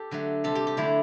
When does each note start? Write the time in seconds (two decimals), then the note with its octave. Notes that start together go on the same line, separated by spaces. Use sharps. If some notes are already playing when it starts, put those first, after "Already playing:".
Already playing: G4 A4
0.11 D3 F#3 A3
0.44 C3 G3 A4
0.55 G4
0.67 G4
0.77 D3 F#3 A3 E4